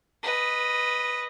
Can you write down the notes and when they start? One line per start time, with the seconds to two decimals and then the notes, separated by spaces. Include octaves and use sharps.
0.23 B4 D#5